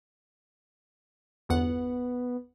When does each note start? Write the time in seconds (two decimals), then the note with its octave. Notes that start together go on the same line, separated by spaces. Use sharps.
1.49 G1 E2 B3 F#5